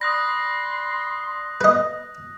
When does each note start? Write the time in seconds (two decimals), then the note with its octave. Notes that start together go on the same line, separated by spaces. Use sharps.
0.01 D5 B5 C6 D#6 F#6 A#6
1.61 B4 D#5